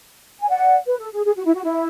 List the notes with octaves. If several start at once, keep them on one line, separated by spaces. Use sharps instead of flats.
G#5
D5 F#5
B4
A4
G#4
G#4
F#4
E4
F#4
E4